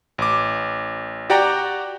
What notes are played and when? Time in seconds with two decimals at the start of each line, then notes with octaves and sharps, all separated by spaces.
0.18 A1 D6
1.30 F#4 G4 D5 F#5 G5 A#5